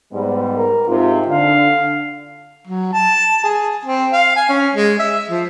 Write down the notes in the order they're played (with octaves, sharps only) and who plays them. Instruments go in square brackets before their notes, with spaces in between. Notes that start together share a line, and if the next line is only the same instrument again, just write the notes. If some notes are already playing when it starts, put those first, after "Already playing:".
[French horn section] G#2 G3 B3
[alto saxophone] A#4
[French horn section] G#2 C3 F4 [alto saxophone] D#4
[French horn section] D3 [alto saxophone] F5
[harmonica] F#3
A5
G#4
C4
F5
G#5
C#4
G#3
E5
F3